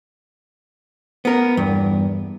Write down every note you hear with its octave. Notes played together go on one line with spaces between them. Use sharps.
B3 A#4
E2 G2